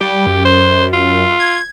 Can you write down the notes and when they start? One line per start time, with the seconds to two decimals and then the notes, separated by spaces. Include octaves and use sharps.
0.01 G3 G4
0.26 F#2
0.45 C5
0.93 F4
1.40 G#6